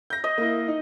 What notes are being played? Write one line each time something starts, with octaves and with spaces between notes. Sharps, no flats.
G6 A#6
D#5
A#3 E4
D#4